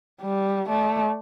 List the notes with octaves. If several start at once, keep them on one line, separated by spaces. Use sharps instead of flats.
G3
A3 D5